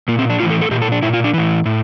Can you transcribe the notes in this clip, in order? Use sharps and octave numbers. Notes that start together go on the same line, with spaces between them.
A#2 A#3
C4
D4
A2 E3 F4
A4
A4
A#2 G4
A4
D4
A#2 E4
F4
D4
A2 E3
A2